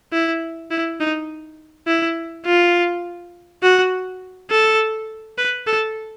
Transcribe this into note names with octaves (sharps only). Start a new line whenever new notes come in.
E4
E4
D#4
E4
F4
F#4
A4
B4
A4